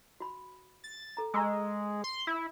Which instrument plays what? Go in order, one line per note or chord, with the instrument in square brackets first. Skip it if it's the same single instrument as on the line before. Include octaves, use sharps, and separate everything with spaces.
[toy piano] F#4 B5
[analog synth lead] A6
[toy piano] A4 A#5
[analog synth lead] G#3 [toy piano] A#5 C#6 E6
[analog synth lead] C6
E4